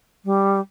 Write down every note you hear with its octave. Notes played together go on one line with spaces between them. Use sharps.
G3